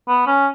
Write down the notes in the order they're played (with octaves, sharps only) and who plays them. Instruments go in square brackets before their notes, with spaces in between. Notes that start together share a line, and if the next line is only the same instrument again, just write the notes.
[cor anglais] B3
C#4